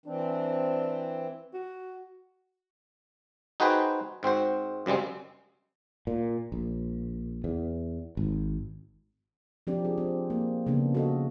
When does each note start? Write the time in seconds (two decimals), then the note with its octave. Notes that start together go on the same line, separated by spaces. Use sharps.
0.06 E3 C4 D4
1.53 F#4
3.60 D#4 F#4 G#4 B4 C5 G5
4.23 G#2 C4 F#4 C5
4.86 F#2 C#3 G3 G#3 C4
6.07 A#2
6.52 A#1
7.44 E2
8.17 G#1
9.67 F3 C4 D4 G4 D5
9.85 G#4
9.98 C4
10.30 A#3
10.66 C#3 A#3 B3 D4
10.94 F#4 A4 D#5